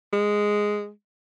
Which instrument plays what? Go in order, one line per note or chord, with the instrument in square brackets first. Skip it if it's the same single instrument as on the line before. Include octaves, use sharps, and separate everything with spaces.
[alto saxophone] G#3